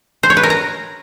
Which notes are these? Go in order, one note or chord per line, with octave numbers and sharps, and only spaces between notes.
C5
C#5
B4
A#4
A#5